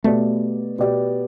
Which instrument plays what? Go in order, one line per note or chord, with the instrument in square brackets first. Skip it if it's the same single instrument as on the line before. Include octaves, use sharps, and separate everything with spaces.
[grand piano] B2 B3 G4 D5 [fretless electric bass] A3
[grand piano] B2 B3 G4 D5